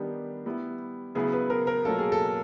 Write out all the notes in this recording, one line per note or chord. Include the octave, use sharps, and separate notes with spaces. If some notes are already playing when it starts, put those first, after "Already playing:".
Already playing: D#3 G3 B3 D4 G4
G3 B3 E4
C#3 F#3 B3 E4 G#4
B4
A#4
A#4
B2 F#3 A#3 C#4 F4 A4
G#4
A4